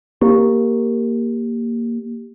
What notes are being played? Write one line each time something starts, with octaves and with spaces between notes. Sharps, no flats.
A#3 G4